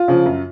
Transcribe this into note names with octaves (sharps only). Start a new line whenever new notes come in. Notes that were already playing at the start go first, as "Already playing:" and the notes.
Already playing: F4
C#3 F3
F#2